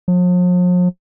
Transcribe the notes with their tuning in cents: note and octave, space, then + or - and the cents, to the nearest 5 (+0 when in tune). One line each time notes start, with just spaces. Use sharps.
F3 +45